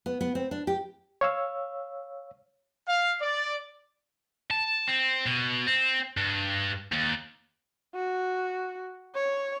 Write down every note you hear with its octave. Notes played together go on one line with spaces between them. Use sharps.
B3
B3
C4
D4
G4
C#5 F5 E6
F5
D5
A5
C4
B2
C4
G2
D#2
F#4
C#5